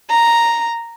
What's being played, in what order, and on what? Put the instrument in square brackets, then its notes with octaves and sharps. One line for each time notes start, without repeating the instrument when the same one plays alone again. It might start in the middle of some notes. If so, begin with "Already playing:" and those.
[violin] A#5